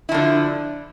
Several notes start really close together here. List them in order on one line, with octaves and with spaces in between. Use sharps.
E4 F3 D3